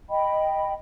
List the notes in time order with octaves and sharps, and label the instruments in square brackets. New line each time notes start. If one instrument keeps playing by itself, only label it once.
[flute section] D#5 G5 B5